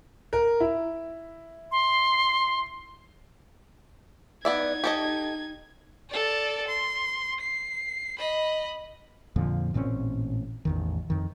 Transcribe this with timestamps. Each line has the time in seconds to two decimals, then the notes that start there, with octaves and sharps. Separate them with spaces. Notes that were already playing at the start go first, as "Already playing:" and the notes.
0.33 A#4
0.60 E4
1.72 C6
4.45 B3 D#4 D5 E5 G#6
4.84 G4 A4 D#5
6.10 A4 D5
6.68 C6
7.40 C7
8.18 D#5 B5
9.36 F2 A#2 D3 F3
9.74 A1 A#2 C4 C#4
10.65 A1 E2 D#3
11.10 F2 D#3